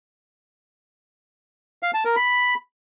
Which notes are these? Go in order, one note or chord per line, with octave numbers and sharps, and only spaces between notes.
F5
A5
A#4
B5